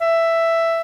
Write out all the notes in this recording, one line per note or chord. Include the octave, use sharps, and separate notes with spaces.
E5